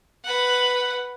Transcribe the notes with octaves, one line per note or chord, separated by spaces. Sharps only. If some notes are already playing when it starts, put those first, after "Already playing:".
B4 F#5